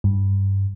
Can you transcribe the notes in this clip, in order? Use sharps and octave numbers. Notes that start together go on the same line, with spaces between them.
G2